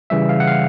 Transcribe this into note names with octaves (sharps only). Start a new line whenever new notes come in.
C#3 E3 G3 E5
F5
F#5
F5